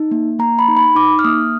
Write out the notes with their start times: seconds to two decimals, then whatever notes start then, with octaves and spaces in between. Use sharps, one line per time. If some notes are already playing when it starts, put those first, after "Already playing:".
Already playing: D#4
0.11 A#3
0.39 A#3 A#5
0.59 B5
0.68 D#4
0.77 B5
0.95 D#4 D6
1.19 F6
1.24 A#3 D#6